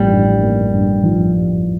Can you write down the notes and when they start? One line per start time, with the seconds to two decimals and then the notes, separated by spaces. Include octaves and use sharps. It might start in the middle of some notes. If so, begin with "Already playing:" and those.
Already playing: A1 F3 G3 A#3
0.08 G2
0.40 A#3
0.71 G2
1.03 F3